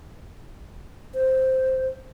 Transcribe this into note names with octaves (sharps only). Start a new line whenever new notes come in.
C5